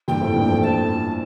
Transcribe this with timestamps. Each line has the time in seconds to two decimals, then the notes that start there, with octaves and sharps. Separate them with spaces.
0.08 G2 A#2 G5
0.21 F2 A2
0.35 G2 A#2
0.49 F3 A3
0.63 F3 A3 A5